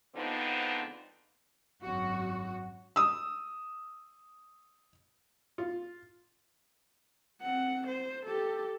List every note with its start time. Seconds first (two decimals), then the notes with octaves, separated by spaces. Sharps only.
0.16 D3 F3 G#3 B3 C4 D#4
1.83 G#1 F#2 F#4
2.96 D#6 E6
5.58 F4
7.42 C4 F#5
7.88 C5
8.26 G4 A4